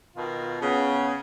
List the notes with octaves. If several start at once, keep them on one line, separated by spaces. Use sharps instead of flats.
B2 D#3 F4
C#3 B3